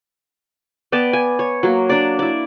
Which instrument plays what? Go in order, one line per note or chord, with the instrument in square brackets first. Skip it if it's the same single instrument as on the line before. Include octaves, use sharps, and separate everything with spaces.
[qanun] B3 D5 G5 A5
G#5
C#5
F#3 A#3
D4 D5
E4 D5